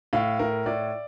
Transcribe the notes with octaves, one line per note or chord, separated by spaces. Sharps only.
A2 F5
A2 A#4
A2 D5